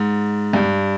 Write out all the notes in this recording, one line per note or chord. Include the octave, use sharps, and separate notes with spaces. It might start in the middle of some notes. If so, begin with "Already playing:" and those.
Already playing: G#2
G2